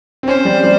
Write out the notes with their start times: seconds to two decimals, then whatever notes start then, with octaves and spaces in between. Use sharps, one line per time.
0.23 C4
0.27 C#4 C5
0.45 G3
0.64 G3